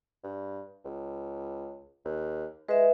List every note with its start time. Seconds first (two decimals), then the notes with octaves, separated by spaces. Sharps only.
0.24 G2
0.85 C#2
2.05 D#2
2.69 G#3 B4 E5